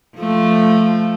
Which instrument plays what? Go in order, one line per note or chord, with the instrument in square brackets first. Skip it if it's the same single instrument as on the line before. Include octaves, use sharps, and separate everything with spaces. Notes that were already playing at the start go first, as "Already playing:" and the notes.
[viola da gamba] F3 A3